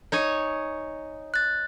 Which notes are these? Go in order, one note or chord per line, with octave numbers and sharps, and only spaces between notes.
D#4 C#5 G#5
F#6 A6